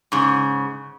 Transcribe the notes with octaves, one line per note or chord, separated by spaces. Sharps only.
G#2 C#3